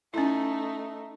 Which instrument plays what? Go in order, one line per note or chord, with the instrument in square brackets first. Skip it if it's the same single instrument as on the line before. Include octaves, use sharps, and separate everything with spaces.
[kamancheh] A3 D#4 [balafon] C#4 E4